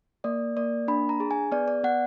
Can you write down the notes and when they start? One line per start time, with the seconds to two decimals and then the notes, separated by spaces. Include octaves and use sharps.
0.24 A#3 D5
0.57 A#3 D5
0.88 D4 B5
1.09 A#5
1.20 G#4
1.31 G#5
1.52 B3 D5
1.68 D5
1.84 B3 F#5